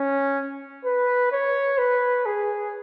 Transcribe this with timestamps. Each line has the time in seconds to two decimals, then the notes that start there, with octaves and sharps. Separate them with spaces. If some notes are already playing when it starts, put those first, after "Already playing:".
Already playing: C#4
0.85 B4
1.32 C#5
1.78 B4
2.26 G#4